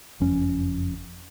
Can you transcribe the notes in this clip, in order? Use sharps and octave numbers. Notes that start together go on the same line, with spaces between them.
F#1 F2 C#4